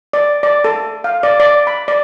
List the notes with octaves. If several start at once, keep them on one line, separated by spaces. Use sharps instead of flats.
D5
D5
A4
F5
D5
D5
B5
D5